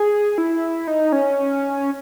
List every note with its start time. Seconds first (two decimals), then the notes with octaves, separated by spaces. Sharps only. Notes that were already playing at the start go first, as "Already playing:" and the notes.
Already playing: G#4
0.38 E4
0.88 D#4
1.12 C#4